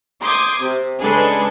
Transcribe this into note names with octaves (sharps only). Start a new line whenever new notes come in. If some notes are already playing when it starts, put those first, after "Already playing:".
C6 D6 D#6 G6 G#6
C3
C#3 G#3 D4 G#4 A4 B4